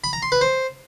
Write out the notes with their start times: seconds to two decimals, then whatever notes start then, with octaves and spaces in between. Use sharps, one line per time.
0.04 B5
0.13 A#5
0.22 C6
0.32 B4
0.41 C5